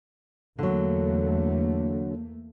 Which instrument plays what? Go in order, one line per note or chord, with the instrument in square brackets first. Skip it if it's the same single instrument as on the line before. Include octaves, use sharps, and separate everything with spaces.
[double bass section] E2 A3 A#3 [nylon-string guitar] D3 F#3